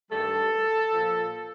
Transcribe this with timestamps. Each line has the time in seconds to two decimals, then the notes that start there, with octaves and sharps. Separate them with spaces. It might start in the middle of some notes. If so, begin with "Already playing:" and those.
0.11 G2 D#3 G3 A4
0.92 A#2 F3